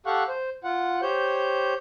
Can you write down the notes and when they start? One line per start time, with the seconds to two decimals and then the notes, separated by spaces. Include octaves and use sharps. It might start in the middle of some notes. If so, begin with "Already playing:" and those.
0.06 G4 A4 F5 F#5 C#6 F#6
0.28 C5
0.64 F4 F#5
1.02 G4 C5 C#5 G6